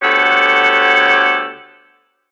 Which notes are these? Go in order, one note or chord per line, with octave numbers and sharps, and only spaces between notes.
D2 B3 G4 A4 C#5 F#5